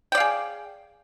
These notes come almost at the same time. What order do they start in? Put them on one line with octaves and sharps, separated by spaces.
G5 D5 F5 G#4